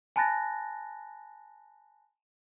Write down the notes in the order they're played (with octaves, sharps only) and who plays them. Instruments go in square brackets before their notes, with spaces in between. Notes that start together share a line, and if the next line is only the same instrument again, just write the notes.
[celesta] G#5 A5 B5 F#6 A6 A#6